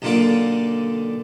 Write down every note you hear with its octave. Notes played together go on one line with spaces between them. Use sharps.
B1 D3 A#3 F4 D5